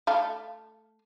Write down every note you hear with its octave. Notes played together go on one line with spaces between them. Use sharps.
A3 F5